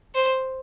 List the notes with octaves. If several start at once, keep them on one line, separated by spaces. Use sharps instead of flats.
C5